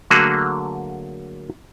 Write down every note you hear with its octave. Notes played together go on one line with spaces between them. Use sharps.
D3 F#3 A3 A#3 F#4 G#4